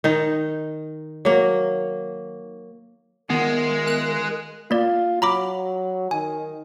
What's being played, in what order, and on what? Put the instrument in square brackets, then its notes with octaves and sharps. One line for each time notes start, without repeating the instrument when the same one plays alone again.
[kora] D#3 D#4
F#3 A#3
[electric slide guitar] D#3 F4 [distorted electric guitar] G#3 [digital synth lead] B3 [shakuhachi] A#4
[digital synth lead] F#6
[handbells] A#3 D5 [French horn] F4
[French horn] F#3 [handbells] A#5 B5 D6
[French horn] D#3 [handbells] G#5